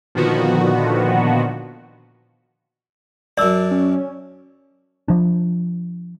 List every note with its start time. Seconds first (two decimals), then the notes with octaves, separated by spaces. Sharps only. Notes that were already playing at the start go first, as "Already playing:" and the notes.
0.15 A#2 D3 D#3 F3 B3 F#4
3.38 F#2 D4 D5 E6
3.71 C#4
5.08 F3 D4